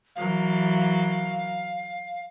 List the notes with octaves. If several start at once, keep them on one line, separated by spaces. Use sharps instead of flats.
E3 F#3 A#4 F5